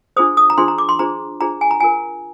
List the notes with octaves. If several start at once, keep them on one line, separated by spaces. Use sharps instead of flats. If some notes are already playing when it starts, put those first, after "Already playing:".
D4 F4 G#4 C5 D#6
D#6
A#5
D4 F4 G#4 C5 C6
A#5
D6
C6
D4 F4 G#4 C5 A#5
D4 F4 G#4 C5 A#5
G#5
A#5
F4 A#4 G#5